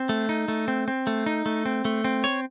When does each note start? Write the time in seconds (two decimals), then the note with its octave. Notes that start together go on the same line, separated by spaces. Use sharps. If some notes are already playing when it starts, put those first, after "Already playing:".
Already playing: C4
0.09 A3
0.29 D#4
0.48 A3
0.68 C4
0.88 C4
1.07 A3
1.26 D#4
1.46 A3
1.66 C4
1.85 A3
2.04 C4
2.24 C#5